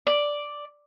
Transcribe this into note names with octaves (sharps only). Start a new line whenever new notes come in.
D5